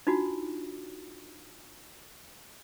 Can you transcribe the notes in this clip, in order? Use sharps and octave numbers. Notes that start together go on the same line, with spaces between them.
D4 D#4 F4 F#4